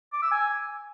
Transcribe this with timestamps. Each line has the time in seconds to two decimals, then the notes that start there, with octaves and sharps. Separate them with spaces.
0.13 D6
0.22 E6
0.32 G#5